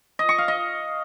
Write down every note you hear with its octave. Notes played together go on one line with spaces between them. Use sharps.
D#5
C#6
F5
D#5